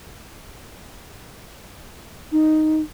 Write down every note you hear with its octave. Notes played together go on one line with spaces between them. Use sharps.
D#4